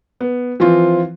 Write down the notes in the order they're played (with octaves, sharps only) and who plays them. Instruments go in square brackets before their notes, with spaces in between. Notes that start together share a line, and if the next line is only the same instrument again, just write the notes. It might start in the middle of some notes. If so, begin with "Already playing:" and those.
[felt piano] B3
E3 F3 C4 F4